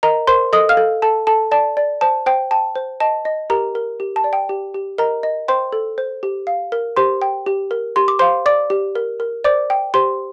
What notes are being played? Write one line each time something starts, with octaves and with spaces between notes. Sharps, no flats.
A#4 D#5 A#5
A#4 C5 C6
A4 D#5 D#6
F5 F6
A4
A4 A5
A4 A5
D5 A5
D5
C5 A5
C5 G5
G5 A5
C5
D#5 A5
D#5
G4 A#4 A#5
A#4
G4
A5
D5
G5
G4
G4
A#4 D#5 A#5
D#5
C5 G5 C6
A4
C5
G4
F5
A#4
G4 C5 C6
G5
G4
A#4
G4 C6
D6
C5 F5 C6
D5 D6
G4
A#4
A#4
C5 D5 D6
G5
G4 C5 C6